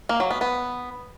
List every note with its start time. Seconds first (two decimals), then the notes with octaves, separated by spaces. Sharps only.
0.09 A#3
0.20 F#3
0.31 B3
0.41 B3